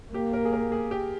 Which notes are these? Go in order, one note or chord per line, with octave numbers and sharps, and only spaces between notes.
A#3 G4
A#4
G#4
A#4
G#4
G4